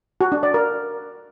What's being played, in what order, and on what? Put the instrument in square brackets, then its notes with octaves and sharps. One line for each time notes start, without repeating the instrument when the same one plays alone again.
[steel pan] F#4
D4
D5
A#4